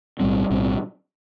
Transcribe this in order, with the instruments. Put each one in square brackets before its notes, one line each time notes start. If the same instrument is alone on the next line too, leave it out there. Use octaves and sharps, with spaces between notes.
[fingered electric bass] B1 A2 G3 C4
B1 A2 G3 C4